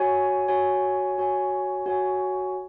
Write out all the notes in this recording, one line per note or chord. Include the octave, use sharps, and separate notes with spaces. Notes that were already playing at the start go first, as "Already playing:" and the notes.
Already playing: F#4 C#5 G#5
F#4 C#5 G#5
F#4 C#5 G#5
F#4 C#5 G#5